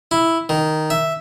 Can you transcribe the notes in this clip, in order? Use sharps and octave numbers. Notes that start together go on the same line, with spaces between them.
E4
D#3
E5